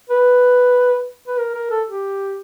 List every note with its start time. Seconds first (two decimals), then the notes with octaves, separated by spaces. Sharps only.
0.10 B4
1.28 B4
1.39 A#4
1.55 A#4
1.71 A4
1.87 G4